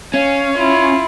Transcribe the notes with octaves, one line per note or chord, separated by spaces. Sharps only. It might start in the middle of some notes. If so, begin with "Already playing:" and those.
C#4 F5
E4 F4